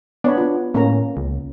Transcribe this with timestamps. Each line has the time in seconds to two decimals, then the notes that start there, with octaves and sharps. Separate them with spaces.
0.24 B3 D4 C#5 B5
0.38 B3 F4
0.74 A2 A#3 C#4 A#5
1.17 C#2